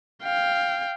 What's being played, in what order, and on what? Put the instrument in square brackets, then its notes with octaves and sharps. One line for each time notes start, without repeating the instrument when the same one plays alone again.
[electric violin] F5 G5